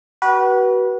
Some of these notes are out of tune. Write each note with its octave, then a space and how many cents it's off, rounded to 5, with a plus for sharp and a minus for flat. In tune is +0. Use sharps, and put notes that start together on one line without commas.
F#4 +30 B4 -25